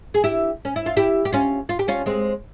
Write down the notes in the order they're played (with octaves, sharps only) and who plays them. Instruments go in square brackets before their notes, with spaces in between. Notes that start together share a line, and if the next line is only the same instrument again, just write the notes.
[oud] G#4
E4 G4
C#4
E4
F4
E4 G4
G4
C#4 F4
F4
G4
C#4 F4
G#3 C4